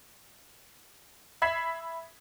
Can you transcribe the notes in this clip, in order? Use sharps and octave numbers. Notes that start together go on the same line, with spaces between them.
E5 B5 G#6 B6 C7 E7